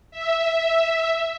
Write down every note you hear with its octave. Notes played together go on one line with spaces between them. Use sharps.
E5